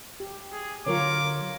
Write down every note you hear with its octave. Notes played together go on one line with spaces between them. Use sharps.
G4
G#4
D3 F#3 F4 A#4 C#5 D6